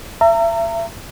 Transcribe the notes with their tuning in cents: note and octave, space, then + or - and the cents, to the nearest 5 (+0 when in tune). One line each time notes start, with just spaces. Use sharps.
E5 +35 A#5 -30